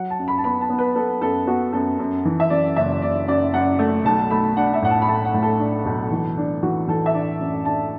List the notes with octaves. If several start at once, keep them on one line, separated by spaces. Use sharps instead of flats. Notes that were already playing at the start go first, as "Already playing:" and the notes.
Already playing: F#3 F#5
A5
F#2
B5
A5
B3 B5
A5
B3
B4
B3 A4
F#2 A4
B3 F#4
F#2 A4
F#2
E3
E5
F#2 D5
F#1 E5
F#1 D5
F#2 D5
F#2 F#5
A3
B1 A5
A3 B5
D4 F#5
E5
A2 F#5
A5
B5
A3 A5
F#5
A2
A4
D4
B1
E3
D4
E3 F#4
E3 A4
E5
D4 D5
F#2
D4 A5